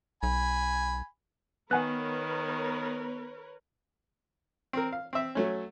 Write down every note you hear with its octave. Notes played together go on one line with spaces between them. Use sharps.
B1 G#5 B5
D#3 B3 A#4 B4 C#5 F#5 G#5 F#6
C4 A#4
F5
C4 E5
F#3 A3 C#4